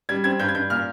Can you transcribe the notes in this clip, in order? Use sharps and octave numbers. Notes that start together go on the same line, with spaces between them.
G3 G#6
C4 G#6
G2 G6
G#6
G2 G6
A#2 F6